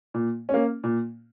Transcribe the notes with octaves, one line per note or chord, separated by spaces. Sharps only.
A#2
C#4
A#3
A#2